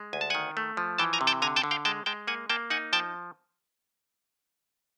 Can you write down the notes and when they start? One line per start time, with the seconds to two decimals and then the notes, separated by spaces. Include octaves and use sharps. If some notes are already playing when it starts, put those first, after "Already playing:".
Already playing: G#3
0.13 D2 G#5
0.21 A5
0.30 D#3 F#5 G#5
0.57 A3
0.77 F3
0.98 E3 G5 A5
1.13 G#5 A#5
1.21 C3
1.27 G5 A5
1.42 D3 G#5 A#5
1.56 G5 A5
1.64 D3
1.71 F5 G5
1.85 G#3 G5 A5
2.06 G#3 G5 A5
2.27 A#3 F#5 G#5
2.49 A#3 G5 A5
2.70 D#4 F#5 G#5
2.93 F3 G5 A5